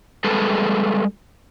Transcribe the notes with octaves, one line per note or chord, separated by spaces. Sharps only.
G3 G#3 G#4 A4 B4